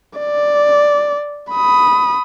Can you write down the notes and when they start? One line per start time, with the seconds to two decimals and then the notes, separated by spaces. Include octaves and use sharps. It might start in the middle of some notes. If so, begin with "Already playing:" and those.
0.19 D5
1.52 B5 D#6